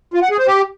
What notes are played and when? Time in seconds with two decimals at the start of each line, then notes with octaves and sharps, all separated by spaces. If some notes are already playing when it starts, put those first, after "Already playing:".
0.14 F4
0.22 F#5
0.30 G#4
0.39 C5
0.47 G4